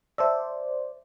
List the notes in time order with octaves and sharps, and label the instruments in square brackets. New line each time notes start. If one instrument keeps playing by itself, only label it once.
[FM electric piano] C5 D5 [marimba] E5 A5 E6